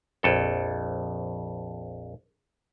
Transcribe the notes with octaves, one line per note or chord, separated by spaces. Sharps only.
A#1 F2 A4